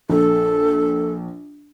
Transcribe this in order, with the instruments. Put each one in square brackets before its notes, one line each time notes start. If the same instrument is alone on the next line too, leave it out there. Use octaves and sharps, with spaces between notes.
[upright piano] A#1 [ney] A4